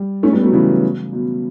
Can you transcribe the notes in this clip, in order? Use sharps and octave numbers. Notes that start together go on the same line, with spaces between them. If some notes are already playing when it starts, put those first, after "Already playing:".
Already playing: G3
A3 C#4
G3 B3
F#3 A3
C#3 E3
B2